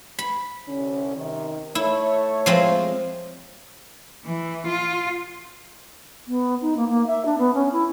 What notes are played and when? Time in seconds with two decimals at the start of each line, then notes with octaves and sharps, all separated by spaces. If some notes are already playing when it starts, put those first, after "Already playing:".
0.19 B5
0.67 C2 D3 C#4
1.15 C3 D#3
1.75 A3 E4 C#5
2.46 F3 G#3 C4
4.25 E3
4.67 F4
6.27 B3
6.61 D#4
6.77 A#3
6.89 A#3
7.07 E5
7.25 D4
7.38 B3
7.54 C#4
7.72 E4